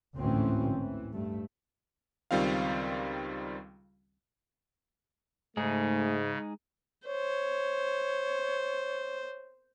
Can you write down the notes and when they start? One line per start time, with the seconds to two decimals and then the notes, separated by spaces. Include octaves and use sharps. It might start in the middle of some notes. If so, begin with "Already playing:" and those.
0.18 G#1 D2 A2 E3 C4 C#4
0.75 E3
1.12 G2 A3
2.31 C#2 D#3 G3 C4 F4 F5
5.57 G#2 C#3 G#3 A3 D#4 G#4
7.07 C5 C#5